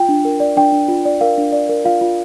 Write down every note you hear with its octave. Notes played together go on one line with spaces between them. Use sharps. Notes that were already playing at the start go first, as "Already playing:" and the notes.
Already playing: F4 G5
D4
A#4
D5
D4 G5
D4
F4
D5
A#4 F5
D4
D5
A#4
F4 F5
F4